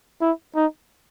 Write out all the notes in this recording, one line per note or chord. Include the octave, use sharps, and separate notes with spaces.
E4
D#4